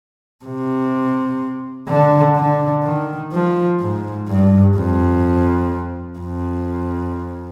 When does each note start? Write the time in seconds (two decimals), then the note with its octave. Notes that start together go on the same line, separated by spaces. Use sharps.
0.45 C3
1.89 D3
2.36 D3
2.84 D#3
3.32 F3
3.80 G#2
4.28 G2
4.76 F2
6.19 F2